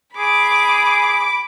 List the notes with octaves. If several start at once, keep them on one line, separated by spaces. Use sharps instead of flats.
G#4 B5 D6